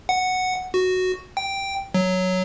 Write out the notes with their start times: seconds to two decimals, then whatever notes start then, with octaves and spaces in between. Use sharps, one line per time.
0.09 F#5
0.74 F#4
1.37 G5
1.94 F#3